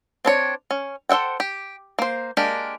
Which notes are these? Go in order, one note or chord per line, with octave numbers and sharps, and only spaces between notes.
C4 D4 C#5
C#4
A4 C5 E5 F#5 G5
G4
A#3 C5
G#3 A#3 D4 G4 A#4